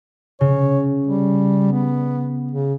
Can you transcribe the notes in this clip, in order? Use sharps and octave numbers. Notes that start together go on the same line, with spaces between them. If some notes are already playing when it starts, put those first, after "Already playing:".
C#3 C#5
G3
B3
C#3